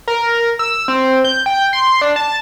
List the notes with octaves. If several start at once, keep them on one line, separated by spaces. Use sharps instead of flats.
A#4
E6
C4
G6
G5
C6
D4
A5